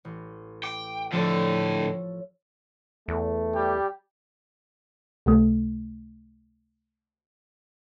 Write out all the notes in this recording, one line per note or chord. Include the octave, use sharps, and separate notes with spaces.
A1
G5 D6
A2 D3 F3 A4 C#5
E2 A3
G3 G4
C#2 C3 A3